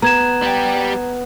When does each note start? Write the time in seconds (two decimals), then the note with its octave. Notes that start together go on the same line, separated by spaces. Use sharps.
0.02 B3 A#5 G#6 E7
0.42 G3 G4